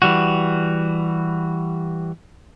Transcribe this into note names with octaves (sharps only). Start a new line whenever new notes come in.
E3 G3 F#4